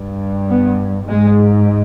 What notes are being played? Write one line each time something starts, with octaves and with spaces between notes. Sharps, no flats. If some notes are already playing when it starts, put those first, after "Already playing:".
Already playing: G2
B3
G#2 G#3